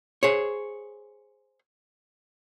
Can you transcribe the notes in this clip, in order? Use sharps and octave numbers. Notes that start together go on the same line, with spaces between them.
G#4 C5 C#5